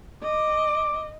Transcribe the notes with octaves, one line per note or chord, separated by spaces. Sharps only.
D#5 D6